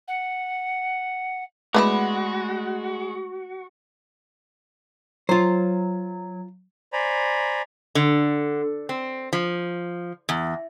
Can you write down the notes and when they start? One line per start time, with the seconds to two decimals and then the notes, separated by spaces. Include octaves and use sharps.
0.08 F#5
1.74 G#3 A3 B3 E4 F#4 B4 B5
5.29 F#3 F4 C5
6.93 C5 D5 G#5 A#5 B5
7.95 D3
8.89 C4
9.33 F3
10.29 E2